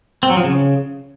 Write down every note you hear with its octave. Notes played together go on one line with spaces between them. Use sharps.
C4
F#3
F3
C#3